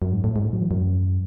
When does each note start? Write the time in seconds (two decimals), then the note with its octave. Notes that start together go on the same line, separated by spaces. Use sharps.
0.02 F#2
0.12 G#2
0.24 A2
0.36 G#2
0.45 A2
0.53 F#3
0.61 E3
0.71 F#2